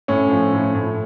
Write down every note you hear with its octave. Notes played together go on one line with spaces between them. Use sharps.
A2 C#4
F3
A2
A2